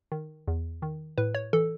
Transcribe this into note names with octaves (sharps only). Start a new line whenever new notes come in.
D#3
E2
D#3
A2 B4
C#5
E3 A4